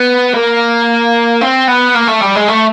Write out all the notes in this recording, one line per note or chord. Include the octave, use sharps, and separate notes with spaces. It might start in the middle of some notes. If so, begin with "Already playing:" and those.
Already playing: B3
A#3
C4
B3
A#3
A3
G3
G#3
A3